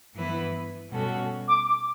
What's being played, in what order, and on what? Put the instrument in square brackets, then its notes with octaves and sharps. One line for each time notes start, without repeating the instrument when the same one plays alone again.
[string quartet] G2 E3 B3 E4 B4
B2 G3 C#4 F#4 A4
[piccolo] D6
D6